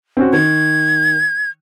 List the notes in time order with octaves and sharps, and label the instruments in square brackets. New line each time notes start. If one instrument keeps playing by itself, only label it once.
[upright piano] C4 C#4 F#4
[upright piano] D#3 [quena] G#6